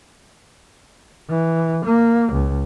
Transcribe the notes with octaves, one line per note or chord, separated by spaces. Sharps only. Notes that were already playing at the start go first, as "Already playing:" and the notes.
E3
A#3
C#2